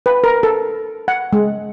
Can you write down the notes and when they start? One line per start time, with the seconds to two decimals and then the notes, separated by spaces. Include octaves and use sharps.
0.06 B4
0.24 A#4
0.43 A4
1.08 F#5
1.33 G#3